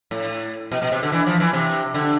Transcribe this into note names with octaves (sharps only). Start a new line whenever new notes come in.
A2
B2
B2
C3
D3
E3
F3
E3
C3
D3